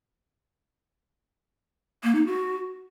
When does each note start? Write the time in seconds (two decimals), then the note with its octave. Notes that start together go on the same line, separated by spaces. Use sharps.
2.04 A#3
2.15 D#4
2.26 F#4